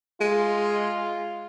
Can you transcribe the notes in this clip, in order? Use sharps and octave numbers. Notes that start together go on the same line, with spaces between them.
G#3 F4